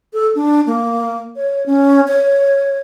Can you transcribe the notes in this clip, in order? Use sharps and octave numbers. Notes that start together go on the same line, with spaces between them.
A4
D4
A#3
C#5
C#4
C#5